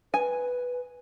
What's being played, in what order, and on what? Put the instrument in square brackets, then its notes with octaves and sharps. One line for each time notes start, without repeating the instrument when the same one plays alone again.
[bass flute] B4 [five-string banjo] G#5